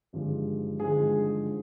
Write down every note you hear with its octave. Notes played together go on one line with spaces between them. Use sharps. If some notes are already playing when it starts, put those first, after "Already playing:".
G#1 G2 D3 F3 G#3
G#1 G2 D3 F3 G#3 G#4